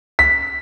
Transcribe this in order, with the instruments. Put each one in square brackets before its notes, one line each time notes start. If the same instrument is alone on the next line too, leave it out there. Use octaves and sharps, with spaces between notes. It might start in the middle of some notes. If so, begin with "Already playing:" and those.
[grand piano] B6